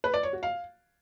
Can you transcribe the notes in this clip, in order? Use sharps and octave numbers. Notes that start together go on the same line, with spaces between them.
B4
D5
C#5
F#4
F5